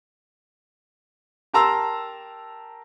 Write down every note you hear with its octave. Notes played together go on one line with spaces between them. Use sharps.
G4 A#4 A5 A#5 C6 E6